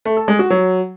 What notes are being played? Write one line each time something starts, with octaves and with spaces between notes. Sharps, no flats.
A3
A4
G#3
F#4
F#3